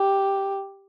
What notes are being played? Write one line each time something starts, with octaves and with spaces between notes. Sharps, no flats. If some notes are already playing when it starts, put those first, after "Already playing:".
Already playing: G4